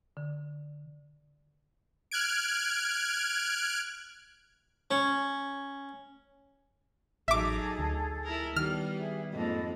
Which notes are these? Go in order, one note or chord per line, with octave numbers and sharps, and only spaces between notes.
D3
F6 F#6 G#6 D7
C#4
A1 F#3 D#4 G#4 A4 E5 D6
D2
E4 A#4
D#3 G3 B3 F6
G#4 E5
F2 G#2 A#3 A4 D#5 B5